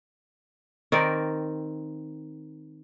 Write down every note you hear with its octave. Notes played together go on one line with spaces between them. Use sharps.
D#3 C4 A#4 D5